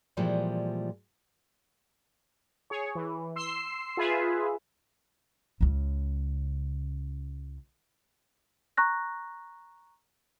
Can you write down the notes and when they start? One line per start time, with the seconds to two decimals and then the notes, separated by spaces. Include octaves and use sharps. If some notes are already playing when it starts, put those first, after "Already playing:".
0.17 A#2 E3 F3 G3 G#3
2.70 G#4 C#5
2.95 E3
3.36 C6 E6 C7
3.97 F4 G#4 B4 E5
5.61 C#2 C#3
8.77 A#5 C#6 F#6 A#6